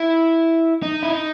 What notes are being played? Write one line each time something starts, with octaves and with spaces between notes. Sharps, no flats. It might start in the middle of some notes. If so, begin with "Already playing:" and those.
Already playing: E4
D#4
E4
D#4